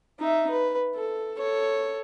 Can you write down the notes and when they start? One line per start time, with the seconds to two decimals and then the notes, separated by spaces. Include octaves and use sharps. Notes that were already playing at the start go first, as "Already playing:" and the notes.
0.19 D#4 E5
0.51 B4
0.95 A4
1.38 A4 C#5